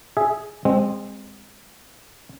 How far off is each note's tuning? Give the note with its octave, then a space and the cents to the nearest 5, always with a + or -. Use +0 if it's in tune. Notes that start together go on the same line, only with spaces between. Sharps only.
G#4 +0 E5 -10
G#3 -25 C4 +0